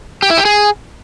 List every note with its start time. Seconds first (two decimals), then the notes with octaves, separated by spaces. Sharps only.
0.22 G4
0.30 E4
0.38 G4
0.45 G#4